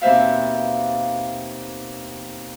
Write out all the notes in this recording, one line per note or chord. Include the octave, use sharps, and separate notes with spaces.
D#2 B2 C4 C5 E5 F5